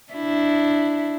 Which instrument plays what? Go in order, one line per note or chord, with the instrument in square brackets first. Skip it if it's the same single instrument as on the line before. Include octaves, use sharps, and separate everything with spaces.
[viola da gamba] D4 E4